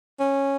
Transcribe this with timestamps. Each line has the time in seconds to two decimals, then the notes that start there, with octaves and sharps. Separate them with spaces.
0.20 C#4